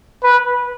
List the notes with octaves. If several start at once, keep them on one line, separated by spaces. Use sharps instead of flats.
B4